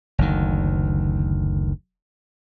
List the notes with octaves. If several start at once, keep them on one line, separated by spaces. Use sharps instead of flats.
F#1 D2 D#3